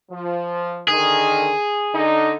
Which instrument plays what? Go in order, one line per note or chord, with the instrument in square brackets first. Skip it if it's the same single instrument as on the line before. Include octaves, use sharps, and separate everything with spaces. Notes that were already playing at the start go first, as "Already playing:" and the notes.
[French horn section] F3
[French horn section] D3 D#3 [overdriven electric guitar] G#4
[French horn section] D3 D#4